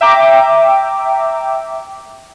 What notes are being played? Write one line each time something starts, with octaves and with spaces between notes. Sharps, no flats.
E5 G5 A#5 D6